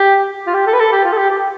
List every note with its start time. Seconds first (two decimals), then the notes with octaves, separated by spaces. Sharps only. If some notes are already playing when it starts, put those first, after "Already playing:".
Already playing: G4
0.47 F4
0.54 G4
0.67 A4
0.73 B4
0.79 A4
0.92 G4
1.04 F4
1.13 A4
1.18 G4
1.30 G4